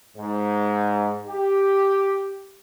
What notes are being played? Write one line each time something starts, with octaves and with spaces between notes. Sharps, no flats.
G#2
G4